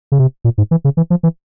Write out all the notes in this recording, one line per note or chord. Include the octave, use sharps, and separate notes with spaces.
C#3
C3
A#2
G#2
E3
C#3
E3
F3
E3